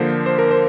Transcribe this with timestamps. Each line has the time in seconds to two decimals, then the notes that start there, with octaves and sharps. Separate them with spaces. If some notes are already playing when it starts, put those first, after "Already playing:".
Already playing: D3 F3 A#3 C5
0.26 C5
0.39 A#4
0.51 C5